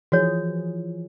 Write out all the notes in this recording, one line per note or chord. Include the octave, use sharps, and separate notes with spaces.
E3 F3 F#4 G#4 C#5